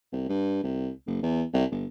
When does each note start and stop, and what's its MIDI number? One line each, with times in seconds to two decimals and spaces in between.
0.13 0.26 36
0.29 0.62 43
0.63 0.90 36
1.07 1.18 30
1.22 1.44 40
1.53 1.64 36
1.71 1.86 31